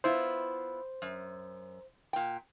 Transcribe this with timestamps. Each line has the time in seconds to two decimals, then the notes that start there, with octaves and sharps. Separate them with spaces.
0.04 B3 E4 F4 C5
1.02 F#2
2.13 A#2 G5